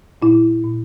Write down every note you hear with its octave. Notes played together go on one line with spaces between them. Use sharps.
A#2 E4
A#2